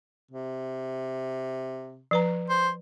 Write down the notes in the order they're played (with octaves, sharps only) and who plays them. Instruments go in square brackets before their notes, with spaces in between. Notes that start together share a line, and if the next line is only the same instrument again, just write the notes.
[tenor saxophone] C3
[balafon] F3 B4 A#5
[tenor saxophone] C5